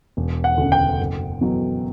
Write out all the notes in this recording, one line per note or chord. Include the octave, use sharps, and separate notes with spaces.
E1
F#5
D2 C#3
G5
F#1
E2 B2 F#3